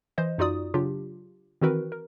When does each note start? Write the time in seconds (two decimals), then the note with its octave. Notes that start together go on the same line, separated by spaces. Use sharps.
0.18 E3 C5 D#5
0.38 F#2 D#4 F4 F#4 D5 D#6
0.74 C#3 F#3 D4 F4 G4
1.62 D#3 E3 C4 F#4 A#4 B4
1.92 A#4